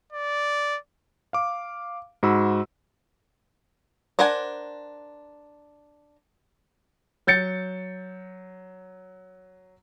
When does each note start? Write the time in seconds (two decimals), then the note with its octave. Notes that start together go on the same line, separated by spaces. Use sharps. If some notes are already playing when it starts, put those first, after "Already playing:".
0.13 D5
1.33 F5 D6
2.23 G#2 F#4 B5 E6
4.19 D4 A#4 C5 F#5 G#5
7.27 F#3 G6 A6 C#7